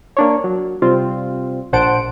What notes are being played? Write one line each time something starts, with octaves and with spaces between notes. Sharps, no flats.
A#3 D4 C#5
F#3
C3 G3 C4 F4
A#1 C5 F#5 A5 D7